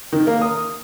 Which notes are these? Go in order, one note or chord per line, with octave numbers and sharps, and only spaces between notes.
D#3
A#3
D#6